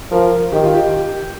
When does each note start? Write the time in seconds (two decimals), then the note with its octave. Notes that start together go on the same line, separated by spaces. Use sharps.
0.11 F3 A#4
0.52 D#3 G4
0.63 F4
0.74 G4